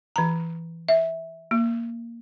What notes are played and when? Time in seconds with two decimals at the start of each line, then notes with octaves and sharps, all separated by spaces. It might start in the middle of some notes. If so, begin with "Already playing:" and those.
0.16 E3 A#5
0.89 E5
1.51 A#3